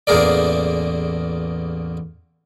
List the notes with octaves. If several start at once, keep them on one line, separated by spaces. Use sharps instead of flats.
A1 E2 A#3 G#4 A#4 D5